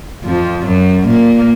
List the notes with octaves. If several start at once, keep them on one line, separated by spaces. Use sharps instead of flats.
F2 F3
F#2 F#3
A#2 A#3